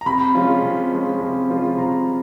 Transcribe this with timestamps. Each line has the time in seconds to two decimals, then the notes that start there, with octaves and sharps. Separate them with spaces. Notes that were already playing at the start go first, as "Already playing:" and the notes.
0.01 A#5
0.06 C3 B5
0.35 F3 G#3 C#4 F4
0.63 C3
0.92 F3 G#3 C#4 F4
1.21 C3
1.50 F3 G#3 C#4 F4
1.78 C3 A#5